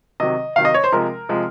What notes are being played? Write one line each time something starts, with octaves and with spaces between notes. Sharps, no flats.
C3 D#3 F#3 D#5
C3 D#3 F#3 F5
D#5
C#5
C5
C3 F3 G#3 A#4
C3 F3 G#3